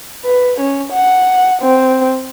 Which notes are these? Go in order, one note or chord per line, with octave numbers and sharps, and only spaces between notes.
B4
C#4
F#5
C4